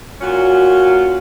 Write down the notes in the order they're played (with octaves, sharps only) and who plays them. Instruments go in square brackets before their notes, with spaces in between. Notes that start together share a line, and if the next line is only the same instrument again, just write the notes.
[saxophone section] A#2 C#4 F4 F#4